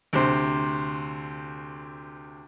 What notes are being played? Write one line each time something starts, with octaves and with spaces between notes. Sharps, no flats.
D2 C3 C5